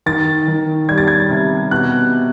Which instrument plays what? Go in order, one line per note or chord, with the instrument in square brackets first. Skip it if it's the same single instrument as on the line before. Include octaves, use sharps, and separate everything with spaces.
[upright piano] D#3 A6
D#3
G3 G#6
A6
G#6
C3
B2 F#6